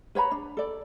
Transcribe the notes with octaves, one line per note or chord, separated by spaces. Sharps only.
B4 C#5 A#5 B5
D4
A4 D5